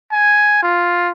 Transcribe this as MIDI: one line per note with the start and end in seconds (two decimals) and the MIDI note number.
0.12 0.58 80
0.62 1.11 65